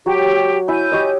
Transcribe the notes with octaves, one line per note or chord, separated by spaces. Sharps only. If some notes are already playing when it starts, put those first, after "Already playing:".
F#3 G4
E4 G#5 G6
G4 C#5 D#5